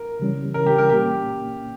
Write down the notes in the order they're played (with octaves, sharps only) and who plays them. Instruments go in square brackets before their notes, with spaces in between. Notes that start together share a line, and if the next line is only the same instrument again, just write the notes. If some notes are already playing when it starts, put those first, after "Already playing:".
Already playing: [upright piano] A#4
[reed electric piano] C#3 E3 G3 C#4
[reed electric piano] C#3 E3 G3 C#4 [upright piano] A#4
[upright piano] G4
A#4
[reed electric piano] A#2 A#3 C#4 [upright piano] G4